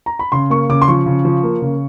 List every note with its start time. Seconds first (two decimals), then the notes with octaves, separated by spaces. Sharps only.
0.06 A#5
0.19 B5
0.32 C#3 C6
0.50 A#3 C#6
0.69 C#3 D6
0.82 C6
0.88 F3 C#6
1.06 C#3
1.25 F3
1.43 A#3
1.62 C#3